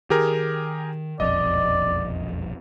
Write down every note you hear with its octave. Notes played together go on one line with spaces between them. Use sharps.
D#3 G4 G#4 A#4
E1 A#1 F2 D5 D#5